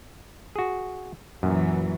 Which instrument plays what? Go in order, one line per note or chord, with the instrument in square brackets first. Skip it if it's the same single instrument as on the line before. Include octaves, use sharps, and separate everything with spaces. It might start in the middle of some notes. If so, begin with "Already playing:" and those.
[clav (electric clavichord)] F#4 G#4
[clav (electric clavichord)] F#2 A#2 [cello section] E3 F#3